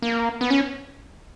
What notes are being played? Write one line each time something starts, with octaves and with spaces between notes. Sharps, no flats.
A#3
B3
C#4